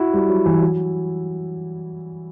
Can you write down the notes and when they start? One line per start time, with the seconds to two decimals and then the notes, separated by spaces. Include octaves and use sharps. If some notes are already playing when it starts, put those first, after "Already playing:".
Already playing: E4 F#4
0.13 G3
0.29 F#3
0.46 E3
0.62 F#3